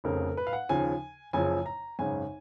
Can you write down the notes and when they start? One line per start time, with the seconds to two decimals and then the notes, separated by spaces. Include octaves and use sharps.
0.04 F1 F2 C#3 A#4
0.37 B4
0.47 F5
0.53 F#5
0.69 D#2 C#3 F3 G#5
1.33 F#1 F#2 C#3 F3 G#5
1.66 A#5
1.99 G#1 F#2 C#3 G#5